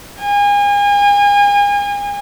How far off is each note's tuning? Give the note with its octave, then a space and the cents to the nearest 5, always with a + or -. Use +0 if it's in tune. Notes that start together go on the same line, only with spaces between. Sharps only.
G#5 -35